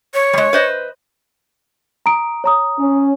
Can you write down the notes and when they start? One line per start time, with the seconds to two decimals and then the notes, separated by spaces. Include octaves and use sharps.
0.14 C#5
0.33 G3 G#3
0.53 B4 C5 D#5
2.06 A#5 D#6 D7
2.44 C#5 A#5 D#6
2.79 C#4